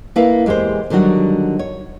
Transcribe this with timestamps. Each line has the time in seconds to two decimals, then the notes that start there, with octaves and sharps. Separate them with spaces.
0.16 A#3 E4 B4 F5
0.46 E2 G#3 G4 A#4 C5
0.90 D3 D#3 F#3 G3 F#4
1.59 C#5